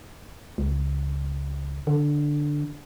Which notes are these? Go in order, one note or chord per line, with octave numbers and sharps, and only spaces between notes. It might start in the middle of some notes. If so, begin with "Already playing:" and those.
C#2
D3